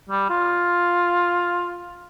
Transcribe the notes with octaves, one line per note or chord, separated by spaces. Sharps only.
G3
F4